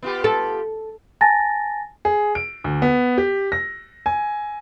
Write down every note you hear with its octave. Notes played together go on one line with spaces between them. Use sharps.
B3 F4 G4
A4
G#5 A5 A6 A#6
G#4
D7
D2
B3
G4
A#6
G#5